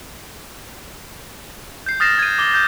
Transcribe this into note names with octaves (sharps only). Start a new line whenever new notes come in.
G6 C7
D#6 F6 A6 A#6 C7 E7
G#6 D#7
D6 G7
G6